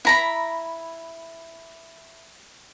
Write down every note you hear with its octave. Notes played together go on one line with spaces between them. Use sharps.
E4 A#5 B5